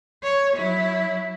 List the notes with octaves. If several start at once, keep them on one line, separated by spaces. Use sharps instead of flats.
C#5
F#3 E4